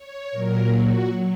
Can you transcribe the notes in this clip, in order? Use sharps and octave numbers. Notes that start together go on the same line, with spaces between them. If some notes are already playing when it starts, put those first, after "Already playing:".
Already playing: C#5
A#2 F#3 A#4
F#4
F#3